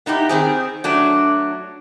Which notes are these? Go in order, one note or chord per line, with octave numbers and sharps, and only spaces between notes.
B3 D#4 E4 G4
D#3 C4 G#4
F#3 A3 D4